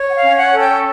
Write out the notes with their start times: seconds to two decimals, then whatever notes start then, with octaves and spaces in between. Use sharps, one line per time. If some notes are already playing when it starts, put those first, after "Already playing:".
Already playing: C#5
0.10 F#5
0.15 F5
0.22 C#4
0.37 F#5
0.51 A4
0.59 G5